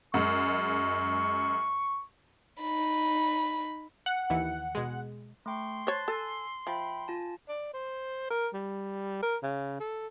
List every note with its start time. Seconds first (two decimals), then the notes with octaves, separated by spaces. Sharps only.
0.14 F#2 G#3 C#6
2.61 D#4 B5
4.06 F#5
4.30 D#2 E3 C#7
4.75 B2 G#3
5.46 A3 G5 C6 C#6
5.87 C5 C#5 A5 F#6 A6
6.08 A4 G#5 E6
6.67 F3 E5 G5 B5
7.08 F4 G#5 A5
7.48 D5
7.74 C5
8.30 A#4
8.54 G3
9.22 A#4
9.43 C#3
9.80 A4